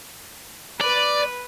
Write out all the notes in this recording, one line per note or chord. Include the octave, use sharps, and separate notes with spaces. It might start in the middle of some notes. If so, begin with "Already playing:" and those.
B4 D5